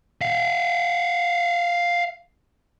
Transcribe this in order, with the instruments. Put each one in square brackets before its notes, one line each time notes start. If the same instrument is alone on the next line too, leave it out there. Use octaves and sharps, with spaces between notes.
[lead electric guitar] E5 F5